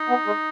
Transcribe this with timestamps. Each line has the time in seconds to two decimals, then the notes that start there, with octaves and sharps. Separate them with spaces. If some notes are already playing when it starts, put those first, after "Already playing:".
Already playing: D#4
0.09 B3
0.26 G#3